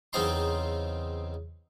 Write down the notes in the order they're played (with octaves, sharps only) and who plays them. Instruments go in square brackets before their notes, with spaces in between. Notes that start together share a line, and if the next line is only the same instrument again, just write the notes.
[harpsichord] E2 C#3 C4 D#4 A#5 C6